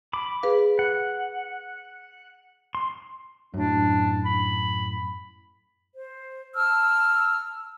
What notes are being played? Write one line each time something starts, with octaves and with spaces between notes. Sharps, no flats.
B5 D6
G#4 B4 F5
F#5
C6
F#2 A2 D4
B5
C5
A5 E6 F6